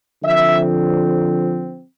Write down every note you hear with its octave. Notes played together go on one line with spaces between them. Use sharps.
D3 F3 C4 E5